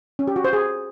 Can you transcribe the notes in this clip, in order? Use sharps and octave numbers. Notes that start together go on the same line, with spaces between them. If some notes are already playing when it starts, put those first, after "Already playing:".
C#4
G4
F#4
C5
G#4